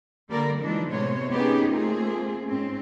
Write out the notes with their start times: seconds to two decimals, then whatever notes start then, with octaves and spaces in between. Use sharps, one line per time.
0.29 D3 G3 A#3 A#4 D5
0.61 E3 F3 G#3 D4 D#4
0.91 A2 C3 G#3 B3 C5 C#5
1.31 A#3 B3 C#4 D#4 G4 G#4
1.72 A3 A#3 C4 F4 G#4
2.46 G#2 C4 C#4